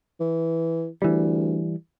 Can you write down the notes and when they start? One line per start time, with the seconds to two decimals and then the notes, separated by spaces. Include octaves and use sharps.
0.20 E3
1.02 D2 E3 G3